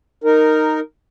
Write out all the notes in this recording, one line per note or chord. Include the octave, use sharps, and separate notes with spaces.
D#4 A#4